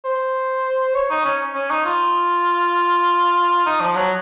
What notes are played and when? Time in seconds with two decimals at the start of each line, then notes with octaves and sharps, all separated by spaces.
0.05 C5
0.95 C#5
1.10 D#4
1.25 C#4
1.55 C#4
1.70 D#4
1.85 F4
3.66 D#4
3.81 F3
3.96 F#3